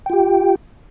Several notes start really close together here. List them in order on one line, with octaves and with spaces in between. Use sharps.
G5 F4 G4